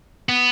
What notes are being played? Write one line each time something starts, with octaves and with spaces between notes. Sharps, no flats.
B3